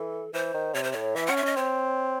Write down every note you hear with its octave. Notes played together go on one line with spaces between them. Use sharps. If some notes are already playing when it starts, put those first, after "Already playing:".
Already playing: E3 A4
E3 C5
D#3
C3 C#5
C5
A2 C#5
E3 E5
C#4 F#5
E5
C#4 D#5
C4 C#5